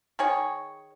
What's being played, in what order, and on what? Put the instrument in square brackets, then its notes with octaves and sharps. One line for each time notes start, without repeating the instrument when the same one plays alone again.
[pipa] D#3 G#4 C#5